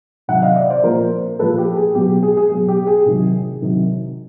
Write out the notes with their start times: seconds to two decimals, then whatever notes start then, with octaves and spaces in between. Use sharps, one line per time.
0.28 C3 D#3 F#3 E5 F#5
0.42 D#5 F5
0.56 D5 E5
0.70 C5 D5
0.83 A#2 F3 A#4 C5
1.39 A#2 A4 B4
1.42 F3
1.58 G4
1.77 G#4
1.94 B2 F#3 G4
2.23 G#4
2.37 G#4
2.50 B2 F#3 G#4
2.68 G4
2.87 G#4
3.06 C3 D#3 F#3
3.62 C3 D#3 F#3